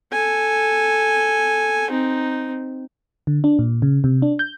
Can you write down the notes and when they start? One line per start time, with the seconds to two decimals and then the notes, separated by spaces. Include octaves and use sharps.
0.12 A4 G#5
1.91 C4 D#4
3.27 D3
3.44 D4
3.59 A#2
3.82 C#3
4.04 C3
4.22 D4
4.39 G6